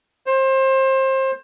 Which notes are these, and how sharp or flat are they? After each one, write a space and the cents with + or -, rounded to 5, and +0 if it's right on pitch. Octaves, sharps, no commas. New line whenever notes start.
C5 +25